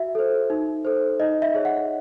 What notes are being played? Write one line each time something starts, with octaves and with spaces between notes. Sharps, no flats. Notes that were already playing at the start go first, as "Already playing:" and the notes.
Already playing: F#4 E5
A4 C5
D#4
A4 C5
D#4 D#5
E5
G#4 C#5
F#5